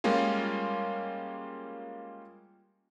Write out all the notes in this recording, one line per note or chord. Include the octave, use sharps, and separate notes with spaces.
G3 G#3 A#3 C#4 F4